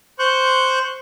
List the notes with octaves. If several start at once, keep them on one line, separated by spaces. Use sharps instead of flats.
C5 C#6 F#6 G6